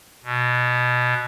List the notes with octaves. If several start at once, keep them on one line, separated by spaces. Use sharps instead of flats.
B2